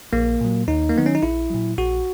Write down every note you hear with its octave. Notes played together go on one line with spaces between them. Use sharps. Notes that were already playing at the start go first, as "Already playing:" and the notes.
A#1 A#3
A#2 F#3
D#2 D#4
A#3
D#3 F#3 B3
C#4
D#4
A#1 E4
A#2 F#3
A#1 F#4